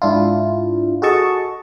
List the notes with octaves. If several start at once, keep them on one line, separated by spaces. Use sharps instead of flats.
G#2 D4 E4 F4
F#4 G#4 A4 D#5 A5 C#6